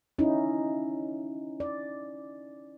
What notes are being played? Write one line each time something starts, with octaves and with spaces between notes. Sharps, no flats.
C#4 D#4 E4
D5